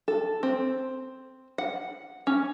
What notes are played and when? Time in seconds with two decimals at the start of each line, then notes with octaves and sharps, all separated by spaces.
0.08 A4
0.43 C4
1.58 F#5
2.27 C#4